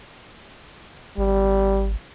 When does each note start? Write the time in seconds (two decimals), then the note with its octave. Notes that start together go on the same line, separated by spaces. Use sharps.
1.18 G#1 G3